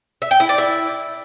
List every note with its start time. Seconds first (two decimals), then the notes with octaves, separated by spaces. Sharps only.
0.22 E5
0.31 G5
0.40 E4
0.49 D5
0.58 E4